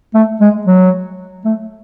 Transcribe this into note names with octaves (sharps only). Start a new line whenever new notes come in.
A3
G#3
F#3
A3